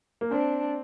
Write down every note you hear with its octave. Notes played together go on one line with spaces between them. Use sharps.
A#3
C4 D4